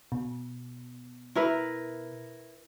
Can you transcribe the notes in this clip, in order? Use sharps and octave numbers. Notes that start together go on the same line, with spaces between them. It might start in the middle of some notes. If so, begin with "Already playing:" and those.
B2
E4 A#4 B4